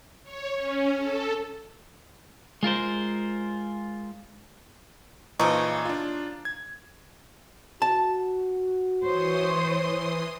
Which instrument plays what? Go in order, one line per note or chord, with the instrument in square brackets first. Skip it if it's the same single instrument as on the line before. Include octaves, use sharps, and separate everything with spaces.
[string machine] C#5
C#4
A4
[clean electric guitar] G#3 F4 A#4 C5
[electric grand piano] A#2 E3 C#6 [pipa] C#3 F3 D#4
[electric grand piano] D4 F4
G#6
[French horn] F#4 [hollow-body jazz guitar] A5
[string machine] E3 C6 D#6 [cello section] C5 C#5